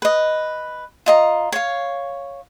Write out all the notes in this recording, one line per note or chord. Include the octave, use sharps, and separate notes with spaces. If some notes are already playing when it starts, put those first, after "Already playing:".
B4 D#5
F4 D#5 A#5
C#5 F5